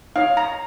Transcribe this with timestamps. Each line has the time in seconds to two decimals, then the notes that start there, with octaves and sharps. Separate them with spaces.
0.16 D#4 C#5 F5
0.37 A#5